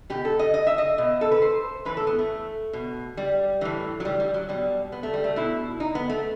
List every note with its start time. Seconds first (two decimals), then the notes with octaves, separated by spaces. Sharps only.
0.10 B2 G4
0.25 A4
0.39 D#5
0.54 D#5
0.67 E5
0.78 D#5
0.98 B2
1.21 A4
1.31 B4
1.42 C5
1.85 A2 E3 B4
1.97 A4
2.07 B3
2.19 A3
2.73 B2
3.17 G3
3.61 A2 E3
4.00 F#3
4.05 G3
4.20 G3
4.34 F#3
4.49 B2 G3
4.92 B3
5.03 A3
5.13 G3
5.24 A3
5.36 B2 E4
5.80 D#4
5.95 B3
6.09 A3